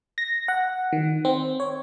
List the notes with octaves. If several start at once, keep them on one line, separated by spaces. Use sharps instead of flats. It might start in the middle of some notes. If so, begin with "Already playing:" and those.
A#6
F#5
D#3
C4
C#5